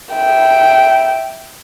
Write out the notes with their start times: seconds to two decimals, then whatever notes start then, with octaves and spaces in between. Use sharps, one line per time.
0.13 E5 G5